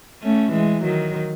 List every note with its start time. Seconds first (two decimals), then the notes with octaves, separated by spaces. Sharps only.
0.23 A3 C#4
0.52 E3 G#3
0.83 D#3 F#3